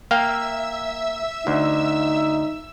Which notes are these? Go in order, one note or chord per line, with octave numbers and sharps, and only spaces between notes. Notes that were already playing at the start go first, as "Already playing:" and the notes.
A#3 E5 F5 G5 E6
D2 D#4